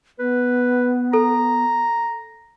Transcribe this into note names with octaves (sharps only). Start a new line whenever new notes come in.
B3 B4
A4 A#5